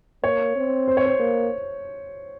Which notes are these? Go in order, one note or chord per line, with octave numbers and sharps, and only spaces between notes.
A#3 C#5
C4
C5
C#5
C5
A#3